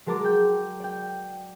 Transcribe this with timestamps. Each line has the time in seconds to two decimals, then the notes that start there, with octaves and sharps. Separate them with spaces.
0.06 F#3 G#3 A#4 A5 A#5 D6
0.24 G5 G6
0.80 D5 G5